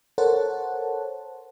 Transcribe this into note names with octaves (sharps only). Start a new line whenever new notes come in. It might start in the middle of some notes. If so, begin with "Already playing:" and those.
A4 A#4 C5 C#5 F#5 A5